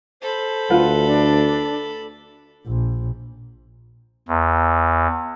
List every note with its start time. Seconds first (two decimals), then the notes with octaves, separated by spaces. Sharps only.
0.22 A4 C5 B5
0.70 D2 F4 B4 F#5
1.06 D4
2.68 A#1
4.28 E2